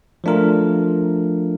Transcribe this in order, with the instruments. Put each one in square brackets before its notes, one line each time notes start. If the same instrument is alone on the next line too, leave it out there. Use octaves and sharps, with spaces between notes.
[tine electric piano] F3 A3 D4 F4 A#4